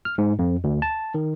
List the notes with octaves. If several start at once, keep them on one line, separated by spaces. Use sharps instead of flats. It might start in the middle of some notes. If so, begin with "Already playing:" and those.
F6
G#2
F2
D2
A5
D#3